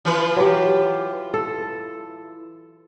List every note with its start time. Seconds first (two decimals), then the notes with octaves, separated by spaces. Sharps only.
0.05 E3 F4 B4
0.36 F#3 G4
1.34 A4